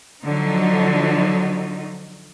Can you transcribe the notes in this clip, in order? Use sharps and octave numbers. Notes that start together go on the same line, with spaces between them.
D3 F3 F#3 D#4